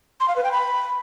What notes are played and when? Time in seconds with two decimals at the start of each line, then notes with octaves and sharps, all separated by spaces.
0.20 C6
0.28 F5
0.36 B4
0.44 G5
0.52 B5